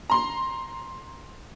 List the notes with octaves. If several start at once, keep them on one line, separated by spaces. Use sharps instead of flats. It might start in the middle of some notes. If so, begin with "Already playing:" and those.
A#5 C6